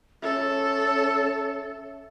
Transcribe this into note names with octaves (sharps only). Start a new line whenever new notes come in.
C#4 A4 E5